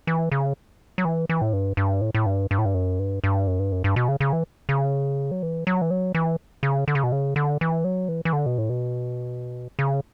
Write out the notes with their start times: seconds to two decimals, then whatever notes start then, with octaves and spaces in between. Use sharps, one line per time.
0.07 E3
0.32 C#3
0.98 F#3
1.05 E3
1.29 E3
1.42 A2
1.53 G2
1.77 G2
2.01 A2
2.15 A2
2.26 G2
2.51 G2
2.58 A2
2.65 G2
2.74 F#2
2.99 G2
3.24 G2
3.47 F#2
3.59 G2
3.72 F#2
3.84 G2
3.96 B2
4.09 C#3
4.20 C#3
4.33 E3
4.69 C#3
5.31 F#3
5.43 E3
5.67 F#3
5.82 E3
5.90 F#3
6.15 E3
6.63 C#3
6.88 D3
6.95 C#3
7.03 B2
7.12 C#3
7.36 D3
7.61 E3
7.84 F#3
8.09 E3
8.25 E3
8.33 D3
8.46 B2
8.58 A2
8.70 B2
9.79 C#3